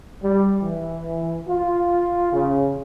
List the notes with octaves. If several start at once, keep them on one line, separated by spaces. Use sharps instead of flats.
G3
E3
F4
C#3